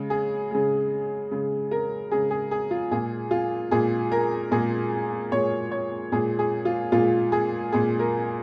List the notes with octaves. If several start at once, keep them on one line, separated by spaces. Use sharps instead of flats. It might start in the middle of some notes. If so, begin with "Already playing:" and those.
Already playing: C#3 G#3
G#4
C#3 G#3
C#3 G#3
A#4
C#3 G#3 G#4
G#4
G#4
F4
A#2 G#3 G#4
F4
A#2 G#3 G#4
A#4
A#2 G#3 G#4
A#2 G#3 C#5
C#5
A#2 G#3 G#4
G#4
F4
A#2 G#3 F4
G#4
A#2 G#3 G#4
A#4